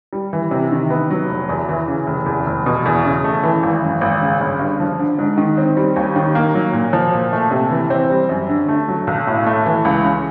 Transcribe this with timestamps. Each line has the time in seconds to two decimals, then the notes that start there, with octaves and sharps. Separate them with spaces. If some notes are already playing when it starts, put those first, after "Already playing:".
0.13 G3
0.33 E3
0.51 C3
0.72 D#3
0.90 B3
1.10 F#3
1.29 F1
1.49 E2
1.69 E3
1.88 C#3
2.07 F1
2.26 E2
2.46 F1
2.66 B2
2.86 E2
3.05 C#3
3.24 A3
3.43 E3
3.63 G#1
3.83 F#2
4.01 G#1
4.21 C#3
4.41 G1
4.59 G2
4.80 F3
4.99 D3
5.19 G#2
5.38 D#3
5.58 C4
5.77 G3
5.96 D#2
6.16 D#3
6.35 A#3
6.55 F#3
6.73 A#2
6.93 F3
7.13 A#2
7.33 A3
7.51 C3
7.70 E3
7.90 C4
8.10 G3
8.29 F#2
8.49 D3
8.68 A3
8.88 F#3
9.07 B1
9.27 A2
9.46 A3
9.66 E3
9.85 C#2
10.04 C#3